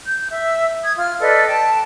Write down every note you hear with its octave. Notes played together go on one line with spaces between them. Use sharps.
G6
E5
D#6 G#6
F4 F6
A4 B4 D5 D#5
G5 A5